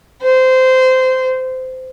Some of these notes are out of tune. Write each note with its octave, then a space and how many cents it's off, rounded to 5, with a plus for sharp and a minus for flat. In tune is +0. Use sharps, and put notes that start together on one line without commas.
C5 -20